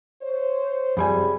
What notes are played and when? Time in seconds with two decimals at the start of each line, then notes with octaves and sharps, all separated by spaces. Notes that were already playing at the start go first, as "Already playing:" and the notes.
0.22 C5 C#5
0.97 F#2 C3 F3 G3 G#4 D5 G#5 B5